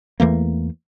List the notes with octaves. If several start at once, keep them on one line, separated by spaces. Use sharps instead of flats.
E2 E3 A3 A#3